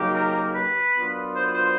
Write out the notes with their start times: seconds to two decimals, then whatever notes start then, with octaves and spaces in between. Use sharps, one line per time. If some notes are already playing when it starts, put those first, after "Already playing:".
Already playing: C#3 F#3 A#3 D#4 G4
0.15 A#4
0.55 B4
0.96 F#3 B3 D4 F4 A#4
1.36 C5
1.54 C5